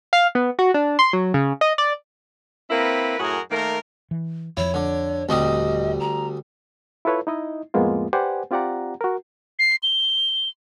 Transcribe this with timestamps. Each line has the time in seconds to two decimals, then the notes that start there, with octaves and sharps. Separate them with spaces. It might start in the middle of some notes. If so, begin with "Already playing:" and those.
0.13 F5
0.35 B3
0.59 F#4
0.74 D4
0.99 C6
1.13 F#3
1.34 C#3
1.61 D#5
1.78 D5
2.70 A#3 C4 E4 A#4 B4
3.19 F#2 A2 F#4 G#4 A#4
3.51 D#3 A3 A#3 A#4
4.11 E3
4.57 F2 F3 E4 C#5
4.74 D3
5.29 D#1 D2 G3 C4 D#5 D#6
6.00 A#5
7.05 E4 F4 A4 B4 C#5
7.27 D#4 E4 D#5
7.74 F2 A2 G#3 A#3 B3 F4
8.13 G4 B4 C5 D5 F#5 G#5
8.51 C4 F4 G4 D5 F#5 A#5
9.01 F#4 A#4
9.59 C7
9.83 G7